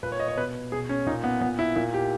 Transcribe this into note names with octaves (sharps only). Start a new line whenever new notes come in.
A#2 B4
C#5
D#5
C#5
B2 B4
B2 G#4
C#4
A#2 D#4
B3
A#2 B3
E4
A#2 E4
G4